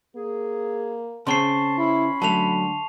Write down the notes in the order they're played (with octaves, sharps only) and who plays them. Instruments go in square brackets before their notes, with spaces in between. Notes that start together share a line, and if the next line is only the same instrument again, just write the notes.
[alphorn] A#3 [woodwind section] G#4
[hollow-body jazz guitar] C#3 C4 [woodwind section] A5 [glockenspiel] C6 C#6 C7
[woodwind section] C#4 C#5 B5 [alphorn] E4
[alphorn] D3 [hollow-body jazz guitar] F#3 A3 [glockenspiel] A5 F7